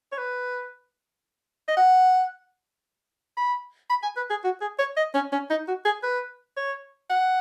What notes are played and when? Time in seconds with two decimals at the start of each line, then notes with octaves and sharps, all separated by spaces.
0.12 C#5
0.18 B4
1.68 D#5
1.77 F#5
3.37 B5
3.90 B5
4.03 G#5
4.17 B4
4.30 G#4
4.44 F#4
4.61 G#4
4.79 C#5
4.97 D#5
5.14 C#4
5.32 C#4
5.50 D#4
5.68 F#4
5.85 G#4
6.03 B4
6.57 C#5
7.10 F#5